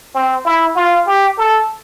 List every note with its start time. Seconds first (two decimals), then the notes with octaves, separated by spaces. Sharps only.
0.14 C4
0.45 E4
0.76 F4
1.07 G4
1.38 A4